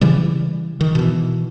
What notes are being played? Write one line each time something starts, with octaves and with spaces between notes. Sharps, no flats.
C#3 E3 G3
D#3
B2 E3